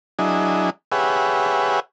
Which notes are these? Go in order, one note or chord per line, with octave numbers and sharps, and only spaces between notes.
F#3 D4 E4 G#4 D#5
G4 G#4 B4 C#5 E5 F#5